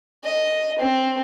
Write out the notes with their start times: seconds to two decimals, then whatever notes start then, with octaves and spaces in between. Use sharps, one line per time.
0.24 D#5
0.78 C4